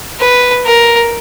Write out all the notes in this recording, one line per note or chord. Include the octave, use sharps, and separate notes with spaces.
B4
A#4